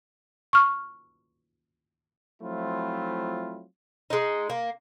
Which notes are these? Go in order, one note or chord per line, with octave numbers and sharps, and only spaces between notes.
C#6 F6
F3 F#3 A3 C4 E4 F4
G#3 D#4
A#3